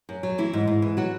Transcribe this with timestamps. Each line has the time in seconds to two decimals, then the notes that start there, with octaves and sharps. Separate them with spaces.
0.09 F#2
0.23 F#3
0.38 E3 E4
0.53 G#2
0.67 G#2
0.82 E3
0.97 F#3 F#4